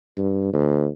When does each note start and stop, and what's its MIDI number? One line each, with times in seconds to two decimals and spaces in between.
0.18 0.49 43
0.53 0.87 38